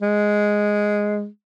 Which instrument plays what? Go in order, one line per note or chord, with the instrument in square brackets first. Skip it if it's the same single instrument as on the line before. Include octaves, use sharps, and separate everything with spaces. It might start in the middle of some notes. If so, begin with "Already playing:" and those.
[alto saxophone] G#3